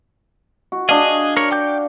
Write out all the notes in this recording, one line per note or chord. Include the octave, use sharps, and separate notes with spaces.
F#4
D4 G#4 D#5 F5
A#4 C#5
G5 D6 G6